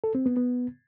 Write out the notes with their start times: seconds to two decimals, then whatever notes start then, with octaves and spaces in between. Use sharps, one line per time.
0.04 A4
0.15 C4
0.26 B3
0.37 B3